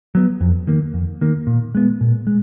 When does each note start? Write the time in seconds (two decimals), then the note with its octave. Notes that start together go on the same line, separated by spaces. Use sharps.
0.15 F#3 B3
0.41 F2
0.67 D#3 A#3
0.94 F2
1.21 D#3 A#3
1.47 A#2
1.75 G#3 B3
2.01 A#2
2.27 G#3